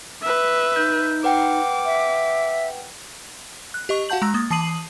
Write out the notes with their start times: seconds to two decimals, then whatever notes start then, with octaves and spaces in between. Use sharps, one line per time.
0.22 B4 E5
0.76 D#4 G6
1.24 B4 F#5 G5 D6
1.85 E5
3.74 F#6
3.89 G4 D#5 C#6
4.09 F#4 F5 F#5 A5 G6 F#7
4.22 G#3 A#5 E6 A#6
4.34 A#3 D#6 A6
4.51 E3 A5 D#6 C7 D#7 F#7